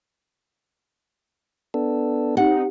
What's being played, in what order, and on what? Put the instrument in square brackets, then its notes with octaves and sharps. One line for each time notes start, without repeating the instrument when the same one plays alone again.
[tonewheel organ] B3 D4 A4
[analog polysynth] C4 D#4 [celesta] G4 [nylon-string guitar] F#5